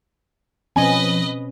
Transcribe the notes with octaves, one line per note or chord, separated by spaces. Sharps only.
B2 F3 C4 C#4 B4 D#5 G#5